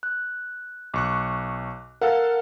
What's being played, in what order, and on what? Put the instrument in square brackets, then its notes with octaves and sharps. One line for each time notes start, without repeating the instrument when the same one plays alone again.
[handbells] F#6
[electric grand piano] B1 C#6 F#6 [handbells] D6
[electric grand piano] A4 F5 F#5 [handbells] A#4